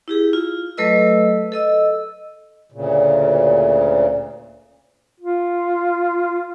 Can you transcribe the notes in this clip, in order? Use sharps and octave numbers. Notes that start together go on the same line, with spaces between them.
E4 G4 G#4
F4
F#3 A3 A4 B4 D#5 E6
A4 D#5 E6
D2 A#2 C#3
F4